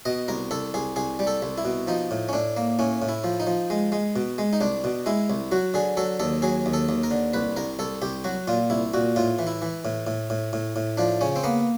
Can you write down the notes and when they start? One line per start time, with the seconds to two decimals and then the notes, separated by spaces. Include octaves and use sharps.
0.05 B2 D#5
0.28 C2 A#4
0.51 C2 A4
0.74 C2 G#4
0.96 C2 G#4
1.19 G3
1.27 A4
1.42 C2
1.58 E4
1.65 B2
1.87 F3 D#4
2.11 A2
2.29 C#4
2.33 A2 D4
2.57 A#3
2.79 A2 C#4
3.02 A2
3.09 E4
3.24 F3
3.40 D#4
3.47 F3
3.70 G#3
3.92 G#3
4.16 B2
4.38 G#3
4.53 D#4
4.61 C2 D4
4.84 B2
5.06 G#3 E4
5.30 C2
5.51 F#3 F#4
5.74 D3 G#4
5.97 F#3 A4
6.19 D#2 A4
6.42 F#3 G#4
6.66 D#2
6.73 A4
6.89 D#2
7.03 A#4
7.11 D3
7.33 C2 B4
7.56 C2 A#4
7.79 C2 A4
8.02 C2 G4
8.24 F#3 F#4
8.48 A#2 F4
8.70 C2 E4
8.94 A#2 F#4
9.16 A2 F4
9.39 E3
9.47 E4
9.62 E3
9.85 A2
10.07 A2
10.30 A2
10.53 A2
10.76 A2
10.97 F3 D4
11.21 C#3 C#4
11.36 C4
11.44 A#3 B3